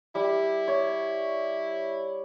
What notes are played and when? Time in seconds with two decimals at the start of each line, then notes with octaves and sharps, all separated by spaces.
0.15 G3 E4
0.68 C#5